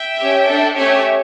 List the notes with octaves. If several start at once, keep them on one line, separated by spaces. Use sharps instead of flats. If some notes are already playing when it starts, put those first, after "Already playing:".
Already playing: E5 G5
C#4 G4
D4 A4
A3 C#4 G4 C#5 E5